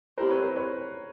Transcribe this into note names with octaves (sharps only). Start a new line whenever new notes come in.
G3 C4 E4 G4 A#4 C5
B4 C#5
A#4 C5
B4 C#5